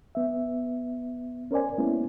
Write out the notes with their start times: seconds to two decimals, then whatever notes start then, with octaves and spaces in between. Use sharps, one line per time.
0.15 B3 E5
1.51 C#4 A#4 C5 D5 G#5
1.78 G#3 A#3 B3 C#4 E4